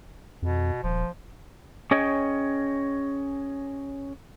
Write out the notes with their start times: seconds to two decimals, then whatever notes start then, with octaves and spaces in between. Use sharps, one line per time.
0.42 F2 B2
0.83 D#1 F3
1.91 C#4 G#4 C#5 D#5 G5